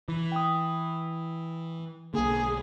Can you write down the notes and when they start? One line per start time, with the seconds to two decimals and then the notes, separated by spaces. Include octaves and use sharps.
0.08 E3
0.32 G5 D#6
2.14 B1 D3 A#3 G#4 G#5